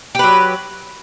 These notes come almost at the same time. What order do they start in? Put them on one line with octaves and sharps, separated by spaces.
G4 B4 F#3